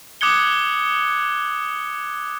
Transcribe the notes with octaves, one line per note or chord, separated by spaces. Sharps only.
D6 D#6 F#6 G#6 C#7 G7